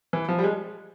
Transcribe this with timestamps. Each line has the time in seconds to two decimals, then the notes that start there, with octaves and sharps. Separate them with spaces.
0.13 E3
0.28 F3
0.38 G3
0.43 G#3